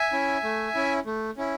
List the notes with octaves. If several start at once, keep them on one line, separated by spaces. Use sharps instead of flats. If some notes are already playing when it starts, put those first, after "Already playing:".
Already playing: E5 G#5
C#4 E4
A3
C#4 E4
A3
C#4 E4